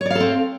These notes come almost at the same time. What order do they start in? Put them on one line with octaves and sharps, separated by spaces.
C#5 D5 F5 A4 C4